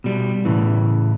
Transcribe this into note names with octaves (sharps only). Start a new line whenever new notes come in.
B2 G3
A2 C#3 E3